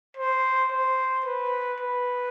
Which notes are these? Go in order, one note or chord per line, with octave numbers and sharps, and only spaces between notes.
C5
C5
B4
B4